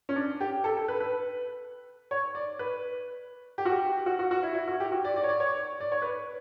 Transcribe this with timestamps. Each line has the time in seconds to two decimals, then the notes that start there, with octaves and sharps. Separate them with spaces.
0.09 C#4
0.16 D4
0.41 G4
0.64 A4
0.77 A4
0.88 B4
1.00 B4
2.11 C#5
2.35 D5
2.59 B4
3.58 G4
3.65 F#4
3.72 G4
4.06 F#4
4.19 F#4
4.31 F#4
4.43 E4
4.55 E4
4.68 F#4
4.80 G4
4.92 F#4
5.05 D5
5.16 D5
5.24 C#5
5.28 D5
5.40 C#5
5.80 D5
5.92 C#5
6.02 B4